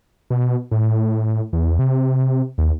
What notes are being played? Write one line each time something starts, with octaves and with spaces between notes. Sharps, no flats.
B2
A2
E2
C3
D#2